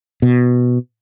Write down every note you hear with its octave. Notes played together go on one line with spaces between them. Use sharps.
B2